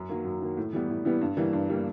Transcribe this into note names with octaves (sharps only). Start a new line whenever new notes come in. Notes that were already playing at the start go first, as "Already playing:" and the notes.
Already playing: F#2
D#3 F#3 A#3
F#2
D#3 F#3 A#3
A2
E3 G3 B3
A2
E3 G3 B3
G2
E3 G3 A#3
G2
E3 G3 A#3